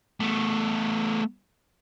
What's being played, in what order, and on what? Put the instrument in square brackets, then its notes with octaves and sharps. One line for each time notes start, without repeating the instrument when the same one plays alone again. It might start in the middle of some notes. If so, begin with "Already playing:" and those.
[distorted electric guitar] A3 B3